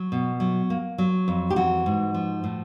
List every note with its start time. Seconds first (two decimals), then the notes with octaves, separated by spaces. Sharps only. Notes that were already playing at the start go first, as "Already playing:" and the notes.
Already playing: F#3
0.12 B2
0.40 F#3
0.70 A#3
0.98 F#3
1.28 F2
1.50 G4
1.56 E3 F#4
1.86 G#2
2.14 F3
2.44 A2